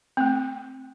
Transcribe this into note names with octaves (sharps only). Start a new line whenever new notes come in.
A3 C4